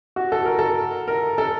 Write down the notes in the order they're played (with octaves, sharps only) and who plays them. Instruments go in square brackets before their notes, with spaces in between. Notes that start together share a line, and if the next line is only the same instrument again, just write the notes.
[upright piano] F#4
A4
A#4
A4
A#4
A4